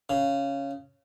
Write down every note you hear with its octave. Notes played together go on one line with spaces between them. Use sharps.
C#3